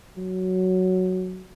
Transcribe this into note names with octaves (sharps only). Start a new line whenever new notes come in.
F#3